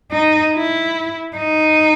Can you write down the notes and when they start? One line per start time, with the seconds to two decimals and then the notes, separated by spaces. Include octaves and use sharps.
0.12 D#4
0.54 E4
1.37 D#4